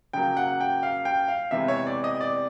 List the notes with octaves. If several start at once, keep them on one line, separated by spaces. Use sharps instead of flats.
C#3 F#3 A#3 G5
F#5
G5
F5
G5
F5
C3 E3 G#3 B3 E5
C#5
D5
D#5
D5